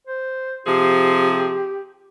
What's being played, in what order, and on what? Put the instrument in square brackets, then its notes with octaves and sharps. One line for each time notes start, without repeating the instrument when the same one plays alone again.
[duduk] C5
[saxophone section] C3 F3 G#4 [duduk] G4